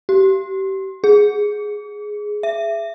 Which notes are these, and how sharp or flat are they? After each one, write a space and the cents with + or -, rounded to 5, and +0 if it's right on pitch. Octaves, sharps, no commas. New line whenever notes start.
G4 -25
G#4 +5
E5 +20